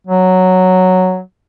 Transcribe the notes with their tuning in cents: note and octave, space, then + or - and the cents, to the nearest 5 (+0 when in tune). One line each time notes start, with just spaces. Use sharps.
F#3 +0